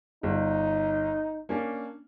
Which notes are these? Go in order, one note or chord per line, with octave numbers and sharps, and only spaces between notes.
G1 D#4
A#3 C#4 D4